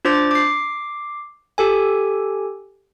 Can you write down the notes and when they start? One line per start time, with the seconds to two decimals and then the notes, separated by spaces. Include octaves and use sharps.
0.05 D4 F4 C5 D6 A6
0.31 D6 C7
1.58 G4 A4 G#5